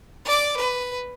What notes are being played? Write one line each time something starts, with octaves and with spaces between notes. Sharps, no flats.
D5 D6
B4